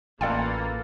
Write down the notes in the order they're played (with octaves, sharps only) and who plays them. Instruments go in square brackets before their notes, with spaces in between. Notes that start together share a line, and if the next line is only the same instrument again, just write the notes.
[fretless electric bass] A1 [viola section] A#3 [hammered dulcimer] F4 A4 B4 [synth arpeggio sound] D5 F5 G5